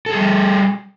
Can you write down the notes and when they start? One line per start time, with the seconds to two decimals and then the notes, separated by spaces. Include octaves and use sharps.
0.06 A4
0.11 G#4
0.15 G3